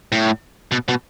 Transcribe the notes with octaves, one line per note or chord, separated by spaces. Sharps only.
A2
B2
B2